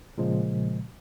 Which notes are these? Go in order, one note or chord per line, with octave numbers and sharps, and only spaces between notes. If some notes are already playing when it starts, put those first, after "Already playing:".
A#2 C#3 F3 G#3